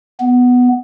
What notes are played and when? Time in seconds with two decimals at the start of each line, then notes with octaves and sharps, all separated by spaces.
0.20 B3